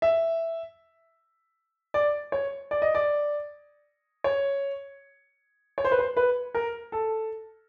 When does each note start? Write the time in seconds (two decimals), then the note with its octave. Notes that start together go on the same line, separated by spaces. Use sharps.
0.02 E5
1.94 D5
2.32 C#5
2.71 D5
2.82 D#5
2.95 D5
4.24 C#5
5.78 C#5
5.85 C5
5.91 B4
5.99 C5
6.17 B4
6.55 A#4
6.92 A4